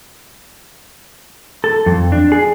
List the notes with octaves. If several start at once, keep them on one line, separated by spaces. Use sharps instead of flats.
A4
F2
D4
G#4